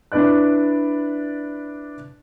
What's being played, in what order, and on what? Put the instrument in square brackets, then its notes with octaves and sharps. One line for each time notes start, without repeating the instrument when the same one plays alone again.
[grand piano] D4 E4 B4 D5 F#6